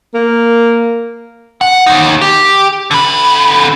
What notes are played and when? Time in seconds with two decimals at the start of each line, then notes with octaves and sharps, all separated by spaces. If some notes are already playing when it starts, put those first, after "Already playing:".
0.14 A#3
1.61 F#5
1.86 D#2 D#4
2.21 G4
2.91 D3 B5